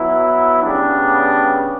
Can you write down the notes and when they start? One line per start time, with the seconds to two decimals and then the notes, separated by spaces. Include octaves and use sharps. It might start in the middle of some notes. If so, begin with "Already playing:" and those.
Already playing: F#3 B3 E4
0.62 C#3 G3 B3 D4